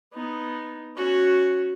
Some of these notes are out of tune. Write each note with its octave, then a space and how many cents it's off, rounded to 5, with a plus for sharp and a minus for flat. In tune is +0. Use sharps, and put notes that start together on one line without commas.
B3 +0 D#4 +0
C#4 -5 F#4 +0